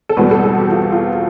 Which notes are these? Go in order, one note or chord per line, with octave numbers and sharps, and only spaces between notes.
A4
E2 B2 G3 C4 B4
A4
A4
G4
F4
F4